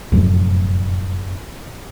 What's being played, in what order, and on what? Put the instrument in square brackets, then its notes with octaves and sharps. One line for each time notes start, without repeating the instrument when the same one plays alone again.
[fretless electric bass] F1 F#2 A2